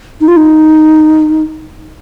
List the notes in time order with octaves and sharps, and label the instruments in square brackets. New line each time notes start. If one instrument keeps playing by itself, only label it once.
[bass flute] D#4
F4
D#4